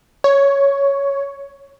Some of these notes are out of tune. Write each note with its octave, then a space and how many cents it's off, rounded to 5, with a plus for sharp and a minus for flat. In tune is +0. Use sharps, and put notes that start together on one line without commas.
C#5 +5